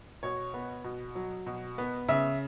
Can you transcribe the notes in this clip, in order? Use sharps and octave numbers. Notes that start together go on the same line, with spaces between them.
B2 C#5
B3
B2
F#3
B2
B3
C#3 E5